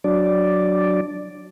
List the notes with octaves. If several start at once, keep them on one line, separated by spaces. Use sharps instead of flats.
F#3 D4 D5